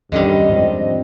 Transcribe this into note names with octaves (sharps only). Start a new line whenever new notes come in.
E2 G2 D3 D#3 G3 C#4 D#5
G#2 F3 C4